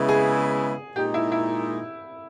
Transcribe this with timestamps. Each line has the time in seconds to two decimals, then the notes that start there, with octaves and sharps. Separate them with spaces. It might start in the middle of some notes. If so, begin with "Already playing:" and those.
Already playing: C#3 G#3 B3 E4
0.08 G#4
0.96 A#2 G#3 D#4 G4
1.14 E4
1.32 E4